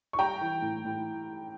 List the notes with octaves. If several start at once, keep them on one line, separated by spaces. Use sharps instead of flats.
C#6
G3 G5 A#5
E3
A2
A2